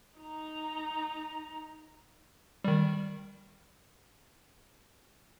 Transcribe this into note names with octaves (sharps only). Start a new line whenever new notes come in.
D#4 A#5
D#3 G3